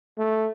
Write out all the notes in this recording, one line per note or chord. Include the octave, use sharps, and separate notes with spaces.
A3